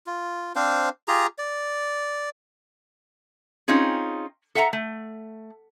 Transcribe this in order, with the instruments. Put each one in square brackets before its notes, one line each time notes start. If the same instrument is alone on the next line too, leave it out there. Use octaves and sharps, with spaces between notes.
[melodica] F4
C4 D4 C5 F5
F4 G4 G#4 A#5
D5
[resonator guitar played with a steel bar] C4 C#4 D#4 F4 G#4
A4 E5 F#5 G#5 A#5
A3